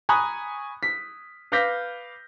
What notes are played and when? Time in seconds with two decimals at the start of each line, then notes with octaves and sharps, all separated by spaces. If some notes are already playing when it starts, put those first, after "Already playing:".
0.09 G#5 A#5 B5 C#6 D#6 F#6
0.83 B6
1.52 B4 F5 D6 G6 A#6 B6